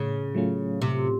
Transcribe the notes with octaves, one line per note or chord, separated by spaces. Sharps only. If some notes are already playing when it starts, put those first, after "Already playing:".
Already playing: A2 C#3
F#3 A3 C#4 F4
A2 C3